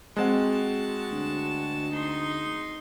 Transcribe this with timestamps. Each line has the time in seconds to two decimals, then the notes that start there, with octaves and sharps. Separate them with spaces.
0.16 G#3 C4 F#4 F#5 A5
1.11 D2
1.92 D#4 C6